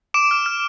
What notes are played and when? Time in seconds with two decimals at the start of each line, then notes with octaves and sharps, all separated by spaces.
0.14 D6 D7 E7
0.31 F6
0.46 F6